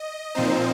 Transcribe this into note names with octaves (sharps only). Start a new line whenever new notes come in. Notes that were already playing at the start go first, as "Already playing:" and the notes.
Already playing: D#5
A#2 F3 C4 D#4 C5